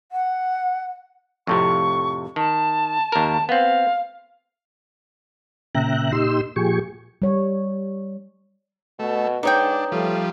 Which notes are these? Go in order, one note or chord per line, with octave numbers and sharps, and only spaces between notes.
F#5
F2 A2 C3 C#6
D#3 A5
D#2 A#4
B3 C4 F5
A#2 C#3 E5 G5 A#5 F#6
A#2 D#4 G4 C6 E6
A#2 F3 G4 G#4 C#6
G3 C#5
B2 A3
G#2 D4 D#4 G#4 B4 C#5 G5
F3 G3 A3